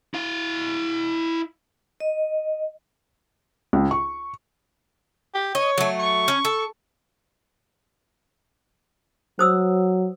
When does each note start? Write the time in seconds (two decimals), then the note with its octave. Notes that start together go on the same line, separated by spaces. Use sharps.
0.14 E4 F5
2.00 D#5
3.73 C#2
3.91 C#6
5.35 G4
5.55 C#5 D#5
5.78 F#3 A3
5.99 C#6
6.28 C#4
6.45 A4
9.39 F#3 C5 D#6 E6